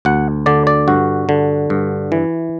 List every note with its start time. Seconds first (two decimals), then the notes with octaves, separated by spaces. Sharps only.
0.05 D2 F#5
0.46 D3 D5
0.67 D5
0.88 G2 F#4
1.29 D3
1.70 G2
2.12 E3